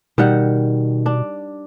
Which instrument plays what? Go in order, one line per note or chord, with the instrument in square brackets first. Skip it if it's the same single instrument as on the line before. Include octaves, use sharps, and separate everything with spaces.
[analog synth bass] B2 [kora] D#3 G3 F#5
[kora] D4